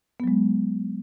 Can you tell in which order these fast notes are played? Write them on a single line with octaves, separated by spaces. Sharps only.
B3 F#3 G#3